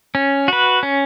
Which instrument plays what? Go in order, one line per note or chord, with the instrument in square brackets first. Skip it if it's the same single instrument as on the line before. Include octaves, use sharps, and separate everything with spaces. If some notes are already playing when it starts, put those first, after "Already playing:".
[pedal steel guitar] C#4
F#4 B4
C#4